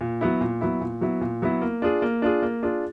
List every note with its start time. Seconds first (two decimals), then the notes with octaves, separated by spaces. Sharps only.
0.01 A#2
0.21 F#3 B3 E4
0.41 A#2
0.61 F#3 B3 E4
0.81 A#2
1.01 F#3 B3 E4
1.21 A#2
1.42 F#3 B3 E4
1.61 A#3
1.82 D4 F4 G#4
2.02 A#3
2.22 D4 F4 G#4
2.42 A#3
2.63 D4 F4 G#4